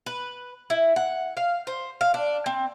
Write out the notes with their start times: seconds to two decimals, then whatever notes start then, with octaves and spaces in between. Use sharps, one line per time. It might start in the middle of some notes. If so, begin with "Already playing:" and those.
0.06 B4
0.70 E4
0.96 F#5
1.37 F5
1.67 C5
2.01 F5
2.14 D4
2.46 C4